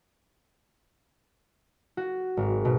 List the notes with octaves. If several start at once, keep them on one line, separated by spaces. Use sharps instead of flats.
F#4
G#1
B2